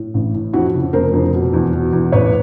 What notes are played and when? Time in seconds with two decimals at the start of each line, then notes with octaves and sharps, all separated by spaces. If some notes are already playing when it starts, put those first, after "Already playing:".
Already playing: A2
0.14 A1
0.34 A2
0.53 F2 E4 F#4
0.74 C#3
0.93 F1 A#4 C5
1.13 F2
1.33 B2
1.53 E2
1.73 B2
1.93 E2
2.12 A1 B4 C#5